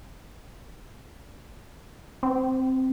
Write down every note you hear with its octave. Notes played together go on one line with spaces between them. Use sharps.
C4